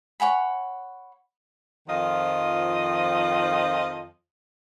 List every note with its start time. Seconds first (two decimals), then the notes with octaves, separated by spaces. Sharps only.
0.20 C#5 F#5 G#5 B5
1.87 F2 D#3 F3 F4 D#5